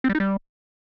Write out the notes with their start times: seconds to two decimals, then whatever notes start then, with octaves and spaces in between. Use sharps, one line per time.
0.04 C4
0.09 G3
0.15 D#4
0.20 G3